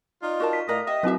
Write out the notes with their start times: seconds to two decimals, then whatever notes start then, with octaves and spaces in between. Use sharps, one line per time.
0.23 D#4 F4 D5
0.40 F#4 A#4 A5
0.53 B6
0.69 A2 A#4 D5 D#5 F5 A#5
0.87 G4 D#5 E5
1.03 F#3 C4 F#4 B4 E5